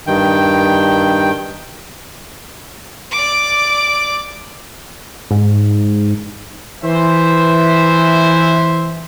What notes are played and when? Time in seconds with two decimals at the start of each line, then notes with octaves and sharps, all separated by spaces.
0.07 G2 D#3 G5
3.11 D5 D6
5.31 G#2
6.83 E3 C5 E5